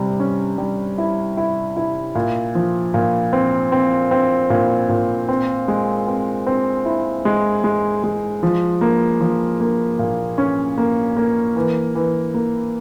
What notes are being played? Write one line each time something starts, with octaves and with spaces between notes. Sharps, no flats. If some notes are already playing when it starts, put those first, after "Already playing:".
Already playing: C3 G3
C#4
G3
E4
E4
E4
A#2
F3
A#2
C4
C4
C4
A#2
A#2
C4
G#3
C4
C4
E4
G#3
G#3
G#3
F3
A#3
F3
A#3
A#2
C#4
A#3
A#3
E3
E3
A#3